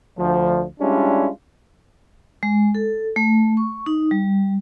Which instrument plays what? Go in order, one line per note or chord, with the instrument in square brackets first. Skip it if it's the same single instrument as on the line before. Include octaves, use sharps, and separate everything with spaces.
[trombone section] D2 F3
G3 G#3 C#4 D4 E4 F4
[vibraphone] G#3
A4
A3
C#6
D#4
G3